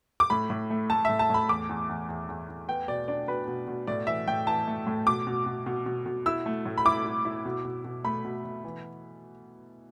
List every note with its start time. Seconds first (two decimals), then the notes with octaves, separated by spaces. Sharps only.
0.20 D6
0.30 A2 B5
0.50 A2
0.70 A3
0.90 A3 A5
1.05 A2 E5
1.19 A5
1.30 A2 B5
1.49 E2 D6
1.69 E2
1.89 E2
2.09 E2
2.29 E2
2.49 E2
2.68 B3 G5
2.88 B2 D5
3.08 D4 D5
3.28 B2 B4
3.48 B2
3.67 B2
3.87 A2 D5
4.07 E3 E5
4.28 A2 G5
4.47 E3 A5
4.67 A3
4.87 A2
5.07 B2 D6
5.27 B2
5.46 B2
5.66 B2
5.86 B2
6.06 B2
6.26 E4 E6
6.46 A3
6.66 A2
6.78 B5
6.85 E4 D6
7.05 E4
7.25 E4
7.45 B2
7.65 B2
7.84 B2
8.04 A3 B5
8.25 B2
8.44 B2
8.64 E3